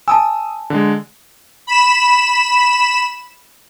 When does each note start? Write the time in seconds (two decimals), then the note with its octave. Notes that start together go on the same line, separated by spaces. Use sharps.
0.08 G#5 A5 D#6 E6
0.70 D3 G#3
1.67 B5 E7